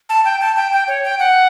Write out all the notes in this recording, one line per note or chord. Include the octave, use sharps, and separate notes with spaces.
A5
G5
A5
G5
G5
C#5
G5
F#5